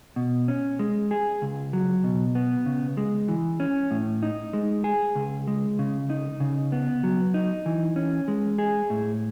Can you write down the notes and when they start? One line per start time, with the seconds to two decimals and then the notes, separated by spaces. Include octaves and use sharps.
0.16 B2
0.48 C#4
0.79 G#3
1.11 G#4
1.42 C#2
1.73 F#3
2.04 B2
2.35 B3
2.66 C#3
2.97 G#3
3.28 E3
3.60 C#4
3.91 A2
4.23 D#4
4.53 G#3
4.84 G#4
5.15 C#2
5.48 G#3
5.79 C#3
6.10 D#4
6.40 C#3
6.72 B3
7.03 F#3
7.34 D#4
7.66 E3
7.96 C#4
8.28 G#3
8.58 G#4
8.90 A2